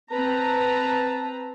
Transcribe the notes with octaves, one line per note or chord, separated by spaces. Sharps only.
C4 B4 A5 A#5